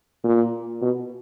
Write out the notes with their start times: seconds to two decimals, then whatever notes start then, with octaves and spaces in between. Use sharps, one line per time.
0.24 A#2
0.82 B2